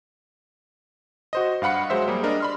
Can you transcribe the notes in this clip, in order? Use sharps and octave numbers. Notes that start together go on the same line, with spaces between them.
F#4 C5 D#5
G2 F5 F#5 B5 C#7
F#3 G#3 C5 E5
G3 A#3 G#4
D4 A#4 D#5
B5 C6 F6